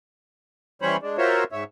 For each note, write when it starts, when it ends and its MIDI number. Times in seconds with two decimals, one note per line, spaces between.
0.82 0.97 52
0.82 0.97 55
0.82 0.97 61
0.82 0.97 72
0.82 0.97 73
0.82 0.97 83
1.02 1.17 56
1.02 1.17 62
1.18 1.44 65
1.18 1.44 66
1.18 1.44 70
1.18 1.44 72
1.18 1.44 73
1.18 1.44 76
1.52 1.64 44
1.52 1.64 73
1.52 1.64 76